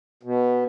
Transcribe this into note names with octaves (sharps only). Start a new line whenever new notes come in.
B2